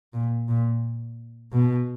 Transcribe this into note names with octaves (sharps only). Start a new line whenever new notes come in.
A#2
A#2
B2